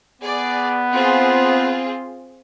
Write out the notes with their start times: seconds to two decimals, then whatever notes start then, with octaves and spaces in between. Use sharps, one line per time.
0.22 B3 G#4 D5
0.93 C4 F4 G#4